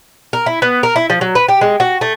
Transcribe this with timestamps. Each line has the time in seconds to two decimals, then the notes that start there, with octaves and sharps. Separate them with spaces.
0.33 A#4
0.46 E4
0.62 B3
0.83 A#4
0.96 E4
1.10 F3
1.21 F#3
1.35 B4
1.48 G4
1.61 G#3
1.80 F#4
2.01 A3